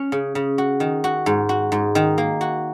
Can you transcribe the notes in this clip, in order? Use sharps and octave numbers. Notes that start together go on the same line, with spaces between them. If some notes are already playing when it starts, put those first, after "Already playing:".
Already playing: C#4
C#3
C#3
F#4
D#3
F#4
G#2
F#4
G#2
D#3
A#3
F#4